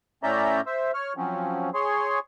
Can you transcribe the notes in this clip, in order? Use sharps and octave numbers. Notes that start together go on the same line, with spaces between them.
A2 C#4 D5 E5 A#5 G6
C5 E5
C#5 F6
F3 F#3 C4 C#4
G#4 C#5 C6